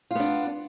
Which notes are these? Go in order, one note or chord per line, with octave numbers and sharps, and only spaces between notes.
B3 D4 F4